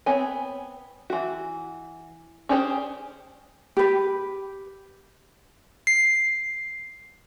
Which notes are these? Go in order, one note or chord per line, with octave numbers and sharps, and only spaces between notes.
B3 C4 C#5 G#5
E3 F#4
C#4 D4 G4 G#4 C5
G4 B4
C7